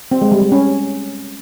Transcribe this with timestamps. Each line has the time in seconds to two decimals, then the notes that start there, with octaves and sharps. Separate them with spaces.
0.12 C4
0.22 G#3
0.32 G3
0.42 G3
0.52 C#4